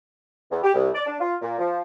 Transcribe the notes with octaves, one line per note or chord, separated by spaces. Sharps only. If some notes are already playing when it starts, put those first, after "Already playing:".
E2
G4
C2
D5
D4
F4
A#2
F3